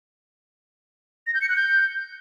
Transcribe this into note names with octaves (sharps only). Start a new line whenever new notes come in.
A#6
G6
C#7
F#6
G6